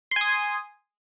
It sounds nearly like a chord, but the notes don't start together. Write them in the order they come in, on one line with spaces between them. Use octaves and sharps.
C6 G#5 D#6